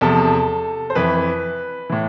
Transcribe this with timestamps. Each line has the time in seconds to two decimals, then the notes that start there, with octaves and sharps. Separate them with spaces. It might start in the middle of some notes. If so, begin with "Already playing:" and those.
0.01 E2 C3 F3 A4
0.90 C5
0.95 F2 E3 B4
1.90 A2 E3